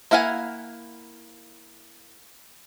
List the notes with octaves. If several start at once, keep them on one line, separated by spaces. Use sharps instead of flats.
A#3 E4 F5 F#5 G#5